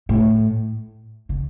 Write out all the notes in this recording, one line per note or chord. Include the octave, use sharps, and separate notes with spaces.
A2
D3